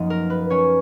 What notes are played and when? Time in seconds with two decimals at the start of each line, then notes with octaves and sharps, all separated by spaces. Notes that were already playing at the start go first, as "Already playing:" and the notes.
Already playing: F#2 F3 A#3 D#4 D#5
0.10 A#4
0.30 B4
0.50 C#4 C#5